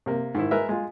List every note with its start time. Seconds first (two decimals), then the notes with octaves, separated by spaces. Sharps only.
0.06 C3 A#3
0.34 G#2 D#3 E4
0.51 G#3 A#4 B4 E5
0.69 G#3 F4